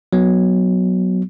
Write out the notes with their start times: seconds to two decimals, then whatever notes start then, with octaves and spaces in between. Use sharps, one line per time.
0.13 F#3 B3